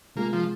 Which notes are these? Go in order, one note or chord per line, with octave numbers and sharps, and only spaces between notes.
C3 G#3 A#3 F4 G#4
F3